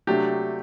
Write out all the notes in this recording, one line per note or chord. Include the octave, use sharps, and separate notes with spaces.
C3 F#3 A3 D4 G4